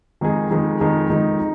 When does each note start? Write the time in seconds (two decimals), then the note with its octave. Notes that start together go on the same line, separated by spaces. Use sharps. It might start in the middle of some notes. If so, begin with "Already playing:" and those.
0.21 F2 D#3 G#3 D#4 G#4
0.50 F2 D#3 G#3 D#4 G#4
0.80 F2 D#3 G#3 D#4 G#4
1.10 F2 D#3 G#3 D#4 G#4
1.39 D#4